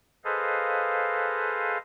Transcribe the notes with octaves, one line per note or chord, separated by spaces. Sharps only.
G#4 A4 B4 C5 D#5 F5